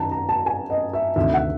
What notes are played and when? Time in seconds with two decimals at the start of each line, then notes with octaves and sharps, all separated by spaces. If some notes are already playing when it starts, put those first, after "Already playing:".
Already playing: F#2 D#3 A5 A#5
0.11 A#5
0.29 A5
0.46 G#5
0.70 D#5
0.93 E5
1.16 D2 C3 D#3 E5
1.34 F#5